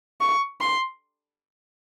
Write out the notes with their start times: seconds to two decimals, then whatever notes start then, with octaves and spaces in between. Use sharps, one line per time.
0.21 C#6
0.61 C6